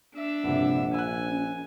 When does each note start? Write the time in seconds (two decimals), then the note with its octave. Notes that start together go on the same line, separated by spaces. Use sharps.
0.14 D4 E5
0.44 A#1 G2 C3 F#5
0.94 G#5 E6 F#6
1.29 C#4